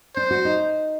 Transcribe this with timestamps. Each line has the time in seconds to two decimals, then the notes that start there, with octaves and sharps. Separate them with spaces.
0.16 D4 C5
0.31 F#4
0.45 D#4